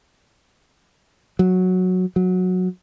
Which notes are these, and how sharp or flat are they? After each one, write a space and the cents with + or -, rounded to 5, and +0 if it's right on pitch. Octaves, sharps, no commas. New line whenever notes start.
F#3 -10
F#3 -15